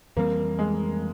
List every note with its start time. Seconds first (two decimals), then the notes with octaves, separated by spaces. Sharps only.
0.16 F2 E3 G3 A#3 C4
0.59 G#3